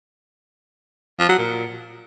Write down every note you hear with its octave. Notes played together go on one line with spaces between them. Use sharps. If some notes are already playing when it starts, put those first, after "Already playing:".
F3
F#3
A#2